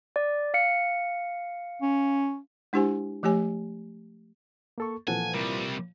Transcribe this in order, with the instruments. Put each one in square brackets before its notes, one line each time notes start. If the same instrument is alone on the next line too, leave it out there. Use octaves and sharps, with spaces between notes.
[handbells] D5
F5 C#7
[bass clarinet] C#4
[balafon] G#3 D4 E4 G4 C5 G#5
F3 A3 G4 C#5 G#5
[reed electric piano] A#3 A4 C#6
[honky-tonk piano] A#2 E3 F3 [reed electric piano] A4 F#5 A5 [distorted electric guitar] G#5
[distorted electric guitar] C3 G3 [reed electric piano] A#4